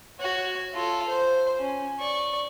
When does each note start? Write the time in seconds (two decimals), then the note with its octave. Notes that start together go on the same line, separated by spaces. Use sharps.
0.19 F#4 C#5
0.74 F4 A4
1.09 C5
1.59 C#4
1.99 D5 C#6